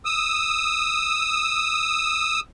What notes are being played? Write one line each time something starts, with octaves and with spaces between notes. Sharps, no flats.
D#6 E6